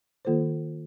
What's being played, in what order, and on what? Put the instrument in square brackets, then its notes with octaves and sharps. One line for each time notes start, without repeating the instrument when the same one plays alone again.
[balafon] D#3 A#3 F4 A4 C5